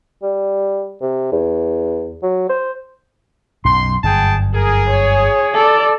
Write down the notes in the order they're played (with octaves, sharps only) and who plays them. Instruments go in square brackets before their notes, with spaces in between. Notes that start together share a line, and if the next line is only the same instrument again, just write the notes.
[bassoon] G3
C3
E2
F#3
C5
[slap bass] B1 F#2 [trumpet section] C6
[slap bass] G1 F#2 [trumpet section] G#4 G5 A5
[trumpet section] G#4 [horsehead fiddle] A#4
[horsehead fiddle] C#5
A4 D5